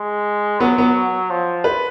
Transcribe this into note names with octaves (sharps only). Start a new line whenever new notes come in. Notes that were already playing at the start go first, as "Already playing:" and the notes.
Already playing: G#3
F#3 B3
B3
F3
B4